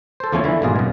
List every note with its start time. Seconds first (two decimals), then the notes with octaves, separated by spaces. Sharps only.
0.20 A4 C5
0.32 E2 F3 A3 C#4 A4 G#5
0.44 D3 E3 E4
0.62 G#1 B2 A#3 F4 G#4
0.76 F#2 B2